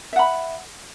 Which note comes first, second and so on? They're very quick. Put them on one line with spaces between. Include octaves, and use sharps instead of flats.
E5 F#5 B5